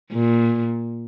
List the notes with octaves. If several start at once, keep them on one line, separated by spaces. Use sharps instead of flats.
A#2